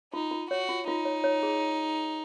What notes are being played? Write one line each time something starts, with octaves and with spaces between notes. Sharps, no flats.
D#4 F4
F4
F#4 C#5
F4
D#4 F4
C#5
C#5
G#4